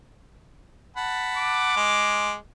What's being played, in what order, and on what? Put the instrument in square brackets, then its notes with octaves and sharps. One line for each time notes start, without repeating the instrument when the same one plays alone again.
[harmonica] F#5 A5 B5
[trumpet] D6
[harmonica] G#3